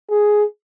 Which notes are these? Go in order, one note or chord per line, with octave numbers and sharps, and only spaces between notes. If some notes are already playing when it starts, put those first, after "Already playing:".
G#4